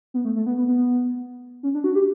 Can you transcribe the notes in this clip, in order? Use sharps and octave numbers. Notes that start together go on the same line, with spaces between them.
B3
A3
A3
B3
B3
B3
C#4
D4
F#4
G4